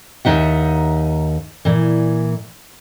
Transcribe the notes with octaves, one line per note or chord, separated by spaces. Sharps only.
D#2 C#3 D#4 E5 F#5
A#2 E3